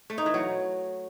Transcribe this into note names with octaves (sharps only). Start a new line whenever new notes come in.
A3
D#4
E3
F#3